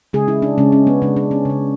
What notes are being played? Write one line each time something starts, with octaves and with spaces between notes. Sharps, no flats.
C#3 G#3 G#4
E4
D4
C#3 G#3 C#4
C#4
B3
C#3 G#3 D4
D4
C#4
C#3 G#3